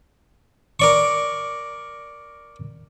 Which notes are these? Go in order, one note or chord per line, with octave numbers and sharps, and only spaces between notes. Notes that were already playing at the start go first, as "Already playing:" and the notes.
A#4 D5 C#6